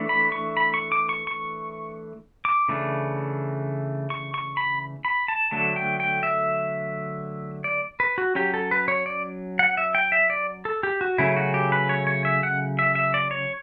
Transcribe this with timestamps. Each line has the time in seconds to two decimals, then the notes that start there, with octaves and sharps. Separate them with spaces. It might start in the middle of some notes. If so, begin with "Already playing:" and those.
Already playing: E3 A3 D4
0.09 B5
0.32 C#6
0.57 B5
0.74 C#6
0.92 D6
1.09 C#6
1.27 C#6
2.45 D6
2.69 C#3 E3 A3 D4
4.10 C#6
4.34 C#6
4.57 B5
5.05 B5
5.28 A5
5.51 D3 F#3 A3 A5
5.76 G5
6.00 G5
6.23 E5
7.64 D5
8.00 B4
8.18 F#4
8.35 F#3 C#4 G4
8.54 A4
8.71 B4
8.88 C#5
9.06 D5
9.59 F#5
9.77 E5
9.95 G5
10.12 E5
10.30 D5
10.65 A4
10.83 G4
11.01 F#4
11.18 C#3 F#3 A3 C#4 E4
11.36 F#4
11.54 G4
11.72 B4
11.89 C#5
12.07 C#5
12.25 E5
12.43 F#5
12.79 E5
12.95 E5
13.14 D5
13.31 C#5